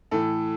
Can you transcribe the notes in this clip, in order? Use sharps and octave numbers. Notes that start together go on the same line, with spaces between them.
A2 E3 A4